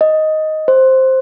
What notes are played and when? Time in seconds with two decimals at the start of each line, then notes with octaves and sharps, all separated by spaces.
0.01 D#5
0.68 C5